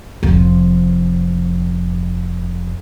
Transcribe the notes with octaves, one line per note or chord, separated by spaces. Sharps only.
F1 F3